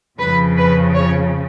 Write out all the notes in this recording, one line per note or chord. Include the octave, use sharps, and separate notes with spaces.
F2 C#3 F3 B4
B4
C#5